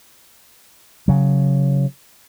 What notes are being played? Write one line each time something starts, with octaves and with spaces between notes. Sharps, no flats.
C#3 F#3